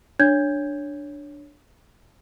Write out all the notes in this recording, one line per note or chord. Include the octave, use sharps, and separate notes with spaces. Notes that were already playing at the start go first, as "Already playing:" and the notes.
D4 C#5 G6 G#6